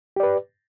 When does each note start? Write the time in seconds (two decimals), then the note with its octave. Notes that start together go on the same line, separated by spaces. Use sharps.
0.16 G4
0.20 D5
0.23 B4